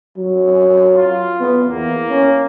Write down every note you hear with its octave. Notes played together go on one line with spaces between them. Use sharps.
F#3
F4
B3
E2 A#3
C#4